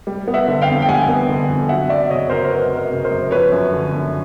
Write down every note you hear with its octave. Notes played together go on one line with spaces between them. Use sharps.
G3
B3
E5 F#5
D3
F5 G5
F2
G5
G3 F#5 G#5
B3
D3
F2
F#3 E5 F#5
F#2 D5 E5
C#3 C#5 D#5
F#2 A#4 C5
A#4
F#3 B4
F#2
A#4
C#3
A#4 C5
F#2
F3 B4 C#5
F#2
D3
F#2